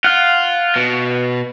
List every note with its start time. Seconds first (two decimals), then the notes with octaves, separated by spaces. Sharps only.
0.04 F4 F5 F#5
0.76 B2